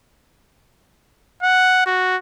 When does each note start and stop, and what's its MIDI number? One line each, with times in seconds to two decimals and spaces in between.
1.43 1.81 78
1.86 2.16 66